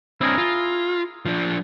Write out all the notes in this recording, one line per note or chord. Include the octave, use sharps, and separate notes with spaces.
C4 D4 E4 G#4 A#4
F4
F3 D4